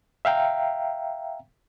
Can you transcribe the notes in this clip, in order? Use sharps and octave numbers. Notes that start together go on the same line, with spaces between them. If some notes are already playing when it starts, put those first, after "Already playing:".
E5 F5 G5 A#5